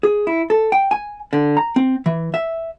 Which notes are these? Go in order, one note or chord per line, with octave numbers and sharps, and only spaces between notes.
G#4
E4
A4
G5
G#5
D3
A#5
C4
E3
E5